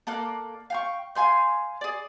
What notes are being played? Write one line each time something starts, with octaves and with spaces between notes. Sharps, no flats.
A#3 A4 D5 F#6
F5 G5 C#6
F5 G#5 C6 G6
G#4 D5